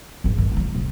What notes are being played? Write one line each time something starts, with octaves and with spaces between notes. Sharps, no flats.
G#1 D#3
G2
C2 F4
C3